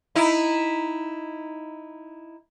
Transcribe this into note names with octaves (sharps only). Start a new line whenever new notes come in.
D#4 E4